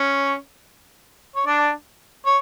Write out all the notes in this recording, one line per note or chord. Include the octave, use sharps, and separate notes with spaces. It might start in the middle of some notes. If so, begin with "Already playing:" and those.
Already playing: C#4 C#5
C#5
D4 D5
C#5